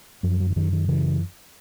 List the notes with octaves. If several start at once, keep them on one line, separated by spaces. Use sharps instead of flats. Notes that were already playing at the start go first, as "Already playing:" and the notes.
F#2 F3
F#3
E3
F#2 D#3
D#3
C#3 E3